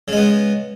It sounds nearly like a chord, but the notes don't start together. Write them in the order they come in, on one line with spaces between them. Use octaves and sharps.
C#3 G#3 B3